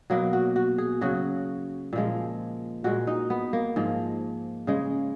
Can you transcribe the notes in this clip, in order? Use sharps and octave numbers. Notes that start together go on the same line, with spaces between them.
B2 F#3 A#3
F#4
F#4
G#4
C#3 F#3 F#4
A#2 F3 G#3
A#2 G#3 F#4
D#4
B3
A#3
G#2 F3 G#3
C#3 G#3